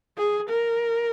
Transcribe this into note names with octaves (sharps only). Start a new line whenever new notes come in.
G#4
A#4